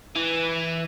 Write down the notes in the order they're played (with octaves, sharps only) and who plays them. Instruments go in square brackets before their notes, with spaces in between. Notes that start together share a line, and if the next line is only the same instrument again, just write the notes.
[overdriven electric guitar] E3